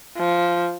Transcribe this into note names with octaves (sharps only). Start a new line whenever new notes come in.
F3